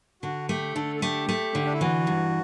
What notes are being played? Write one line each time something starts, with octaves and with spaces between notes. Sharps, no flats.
D3 F#4
A3 G4
D3 A4
A4
A3 G4
A3
D3
D4
E4
E3 F#4
G2